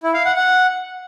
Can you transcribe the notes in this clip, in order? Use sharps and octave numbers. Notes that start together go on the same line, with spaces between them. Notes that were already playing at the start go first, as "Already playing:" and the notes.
E4
F5
F#5
F#5